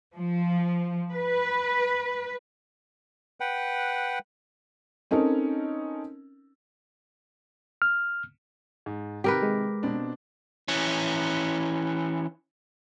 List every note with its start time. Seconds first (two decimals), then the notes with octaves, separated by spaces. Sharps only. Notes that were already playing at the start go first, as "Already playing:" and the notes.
0.15 F3
1.11 B4
3.40 B4 F#5 G5
5.11 C4 C#4 D#4 A4 A#4
7.82 F6
8.86 G#2
9.24 C3 D#3 G4 A#4 B4
9.43 G#3
9.83 B2 C4 D4
10.68 E3 C#4